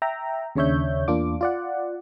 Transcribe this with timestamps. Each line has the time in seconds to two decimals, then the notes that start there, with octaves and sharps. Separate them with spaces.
0.02 E5 G5 A#5
0.55 D#2 C#3 D4 C#5 E5 G6
1.08 E2 A#3 D4 F4 D6
1.41 F4 D5 F#5